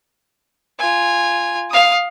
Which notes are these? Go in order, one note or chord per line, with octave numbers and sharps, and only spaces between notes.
F4 G#5
F5 D#6